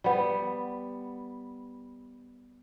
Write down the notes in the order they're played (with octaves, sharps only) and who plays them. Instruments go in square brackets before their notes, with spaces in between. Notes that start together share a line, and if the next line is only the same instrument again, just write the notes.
[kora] G3 B3